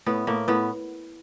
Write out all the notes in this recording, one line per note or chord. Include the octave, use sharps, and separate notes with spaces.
A2 B3
A2 A#3
A2 B3